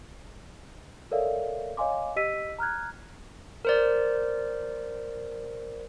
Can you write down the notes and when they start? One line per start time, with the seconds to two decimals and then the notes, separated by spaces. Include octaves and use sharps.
1.11 A4 A#4 C#5 D5 E5 F5
1.77 C#5 D#5 F5 G#5 C6 D6
2.16 G4 D#5 E6 B6 D#7
2.59 A#5 F6 F#6 G#6
3.65 A#4 C5 D5